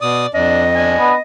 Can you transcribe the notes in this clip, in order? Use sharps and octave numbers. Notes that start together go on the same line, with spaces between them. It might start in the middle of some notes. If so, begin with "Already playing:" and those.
B2 D5 D#6
F2 D4 D#5
D4 G#5
B3